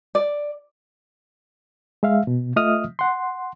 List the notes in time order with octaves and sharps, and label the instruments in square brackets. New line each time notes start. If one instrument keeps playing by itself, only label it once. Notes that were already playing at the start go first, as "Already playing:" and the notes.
[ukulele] D5
[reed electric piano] G#3 E5 F5
B2
A3 F4 D#5 E5 D#6 F6
F#5 C6